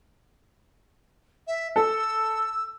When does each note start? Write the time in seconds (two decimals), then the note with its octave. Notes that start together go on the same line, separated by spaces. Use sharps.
1.47 E5
1.76 A4 E6